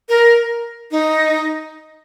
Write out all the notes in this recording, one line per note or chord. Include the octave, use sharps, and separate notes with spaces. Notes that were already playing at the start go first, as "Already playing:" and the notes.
A#4
D#4